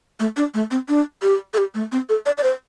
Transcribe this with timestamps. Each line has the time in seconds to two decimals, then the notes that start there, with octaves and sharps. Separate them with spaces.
0.20 A3
0.37 D4
0.54 A3
0.71 C4
0.89 D4
1.22 G4
1.54 A4
1.58 G4
1.75 A3
1.92 C4
2.09 A4
2.26 D5
2.38 D5
2.43 C5